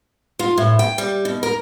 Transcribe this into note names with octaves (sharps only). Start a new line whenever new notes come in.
F4
A2
G5
G3
B2
A#4